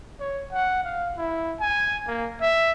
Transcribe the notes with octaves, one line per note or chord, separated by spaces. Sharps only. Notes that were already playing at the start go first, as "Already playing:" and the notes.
C#5
F#5
F5
E4
G#5
A#3
E5